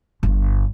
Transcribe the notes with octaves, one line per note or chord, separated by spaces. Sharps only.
G1